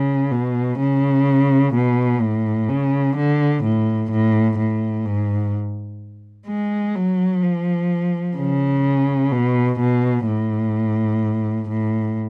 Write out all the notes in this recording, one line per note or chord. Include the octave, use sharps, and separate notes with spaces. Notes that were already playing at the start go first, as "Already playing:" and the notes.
Already playing: C#3
B2
C#3
B2
A2
C#3
D3
A2
A2
A2
G#2
G#3
F#3
F3
C#3
B2
B2
A2
A2